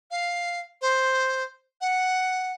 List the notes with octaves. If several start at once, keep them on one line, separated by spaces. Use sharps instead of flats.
F5
C5
F#5